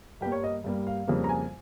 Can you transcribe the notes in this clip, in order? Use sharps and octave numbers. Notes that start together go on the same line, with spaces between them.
G2 G3 A#3 G4
C#5
D#5
G2 G3 A#3
F5
F2 C#3 G3 A#3
A#5
G#5